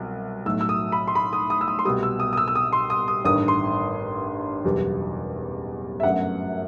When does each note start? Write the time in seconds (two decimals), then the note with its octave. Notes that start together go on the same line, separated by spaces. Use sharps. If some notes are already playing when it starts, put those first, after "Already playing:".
Already playing: C2 B2 F#3
0.46 B1 A2 F#3 A3 E6
0.61 E6
0.69 D#6
0.92 B5
1.08 C6
1.15 B5
1.33 D#6
1.50 D#6
1.61 E6
1.68 D#6
1.79 C6
1.85 C2 B2 G3 D#6
2.03 E6
2.20 D#6
2.33 D#6
2.37 E6
2.48 E6
2.55 D#6
2.73 C6
2.90 D#6
3.08 D#6
3.25 A1 G2 D#3 D#6
3.48 C6
4.65 F#1 E2 B2 G3
6.00 E5
6.03 G1 F#2 F#3 A3 F#5